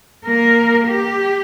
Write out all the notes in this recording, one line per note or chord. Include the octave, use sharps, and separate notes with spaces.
A#3 A#4
G4